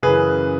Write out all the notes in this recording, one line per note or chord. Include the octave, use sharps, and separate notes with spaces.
F#2 C#3 E3 G#4 B4